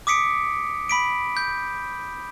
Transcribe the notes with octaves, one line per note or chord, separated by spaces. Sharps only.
D6 D#6 B6 C#7 D7
B5 B6 D7
G6